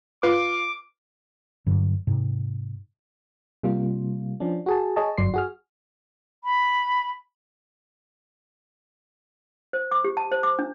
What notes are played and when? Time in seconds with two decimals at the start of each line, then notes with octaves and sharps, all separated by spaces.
0.23 F4 B4 D6
1.66 G2 D3 F#3
2.07 G#2 C3
3.63 C3 G3 A#3 F4
4.40 F3 C#4 D4
4.66 F#4 G#4 A5
4.96 G#4 C#5 D#5 A5
5.18 G1 F#2 F#3 D5 C6 C7
5.34 F#4 G#4 F6
6.44 B5
9.73 C5
9.91 D6
10.04 G4
10.17 A5
10.32 C5
10.43 D6
10.59 D4